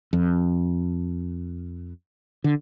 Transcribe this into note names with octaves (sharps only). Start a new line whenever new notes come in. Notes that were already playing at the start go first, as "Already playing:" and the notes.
F2
D3